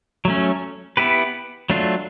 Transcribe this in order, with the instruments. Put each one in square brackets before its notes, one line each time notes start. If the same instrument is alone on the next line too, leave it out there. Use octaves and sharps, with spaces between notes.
[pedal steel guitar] F#3 A3 C#4
B3 E4 G4 B4
F#3 A3 D4 F4